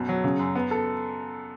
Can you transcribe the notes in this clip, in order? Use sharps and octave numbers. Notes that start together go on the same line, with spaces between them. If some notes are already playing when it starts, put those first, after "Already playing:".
Already playing: F#2 B2
F#3
C#3
F#2
B3
A4